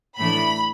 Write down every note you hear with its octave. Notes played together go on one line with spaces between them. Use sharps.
A2 E3 A3 D4 B5